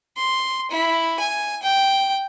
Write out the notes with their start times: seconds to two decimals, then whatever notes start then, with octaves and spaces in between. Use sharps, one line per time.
0.17 C6
0.71 E4
1.20 G#5
1.63 G5